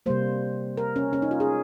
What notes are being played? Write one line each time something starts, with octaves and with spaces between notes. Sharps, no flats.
C3 G3 A#3 C5
A#4
C#4
C#4
D#4
F4
G#4